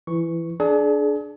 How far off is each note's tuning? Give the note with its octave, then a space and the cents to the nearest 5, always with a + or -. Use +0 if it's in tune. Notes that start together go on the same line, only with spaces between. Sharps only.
E3 +15 C#6 +0
D4 +0 G#4 +35